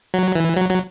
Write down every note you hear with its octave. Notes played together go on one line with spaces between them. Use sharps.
F#3
E3
F#3
F#3